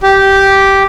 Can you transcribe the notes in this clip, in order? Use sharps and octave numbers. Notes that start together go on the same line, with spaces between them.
G4